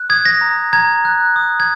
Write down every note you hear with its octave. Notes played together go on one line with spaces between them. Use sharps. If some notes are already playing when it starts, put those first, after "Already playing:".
Already playing: F#6
D#6 G#6
A#6
A#5
A#5 G#6
F#6
D#6
G#6